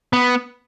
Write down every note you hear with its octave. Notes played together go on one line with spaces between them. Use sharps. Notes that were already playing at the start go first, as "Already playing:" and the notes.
B3